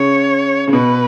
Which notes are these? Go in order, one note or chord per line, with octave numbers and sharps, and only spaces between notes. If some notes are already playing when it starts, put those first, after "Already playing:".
Already playing: C#3 C#5
C#3
B2 B4